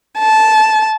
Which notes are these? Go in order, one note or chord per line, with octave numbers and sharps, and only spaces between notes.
A5